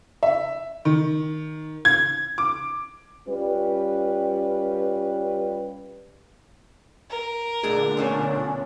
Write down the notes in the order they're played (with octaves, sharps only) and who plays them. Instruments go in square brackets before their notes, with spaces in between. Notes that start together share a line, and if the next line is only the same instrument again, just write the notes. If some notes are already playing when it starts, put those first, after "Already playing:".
[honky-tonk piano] E5
D#3
G#6
D6
[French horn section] G3 C#4 F4 B4
[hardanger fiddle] A#4
[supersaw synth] A#2 D3 D4 [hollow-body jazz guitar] A3 G#4
[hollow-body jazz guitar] B1 A3 F5 [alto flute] C#4